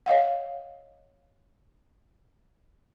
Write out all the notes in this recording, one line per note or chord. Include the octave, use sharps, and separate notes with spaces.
C#5 D#5 F5 F#5